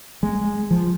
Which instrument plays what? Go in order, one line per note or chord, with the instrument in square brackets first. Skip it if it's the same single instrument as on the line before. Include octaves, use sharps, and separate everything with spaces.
[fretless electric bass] G#3
F3